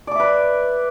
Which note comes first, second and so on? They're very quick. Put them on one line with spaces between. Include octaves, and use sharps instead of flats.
D5 D6 E5 B4